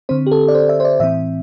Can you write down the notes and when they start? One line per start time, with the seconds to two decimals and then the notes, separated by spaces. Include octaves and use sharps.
0.09 D3 C4 C5
0.27 G4
0.32 A4
0.48 D5
0.55 C5
0.69 E5
0.80 C5
0.85 D5
1.00 A2 E3 C4 E5